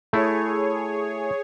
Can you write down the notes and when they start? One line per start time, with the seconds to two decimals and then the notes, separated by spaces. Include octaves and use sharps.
0.13 A3 E4 G#4 C#5